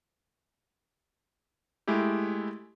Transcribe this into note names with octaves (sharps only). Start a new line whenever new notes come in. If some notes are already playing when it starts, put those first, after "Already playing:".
G#3 A3 E4 G4